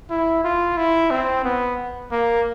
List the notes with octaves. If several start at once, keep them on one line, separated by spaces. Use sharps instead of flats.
E4
F4
E4
C4
B3
A#3